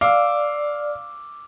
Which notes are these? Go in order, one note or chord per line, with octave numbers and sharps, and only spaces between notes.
D5 F5 D6 E6